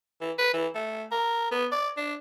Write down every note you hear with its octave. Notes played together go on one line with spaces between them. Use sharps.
E3
B4
E3
A3
A#4
B3
D5
D4